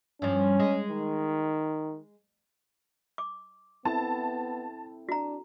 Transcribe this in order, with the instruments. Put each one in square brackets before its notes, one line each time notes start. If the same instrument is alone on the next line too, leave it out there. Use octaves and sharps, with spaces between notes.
[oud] G2 F3 [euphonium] C#4
[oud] G#3
[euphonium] D#3
[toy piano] D6
[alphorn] B3 [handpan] C4 E4 A4 [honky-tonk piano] A5
[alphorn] D4 [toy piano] F#4 A#5